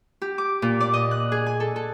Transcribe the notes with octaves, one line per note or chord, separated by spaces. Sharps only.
G4
D6
A#2
D5
D#5
F#6
G#4
G#5
A4
A4